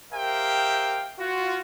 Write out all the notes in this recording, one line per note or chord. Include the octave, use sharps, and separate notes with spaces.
G4 A#4 C5 E5 F5 G5
F4 F#4